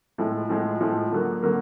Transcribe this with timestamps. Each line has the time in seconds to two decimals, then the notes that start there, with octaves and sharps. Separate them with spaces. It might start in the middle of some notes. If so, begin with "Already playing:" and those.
0.18 A2 F3 G#3
0.49 A2 F3 G#3
0.80 A2 F3 G#3
1.12 D3 F#3 A#3
1.42 D3 F#3 A#3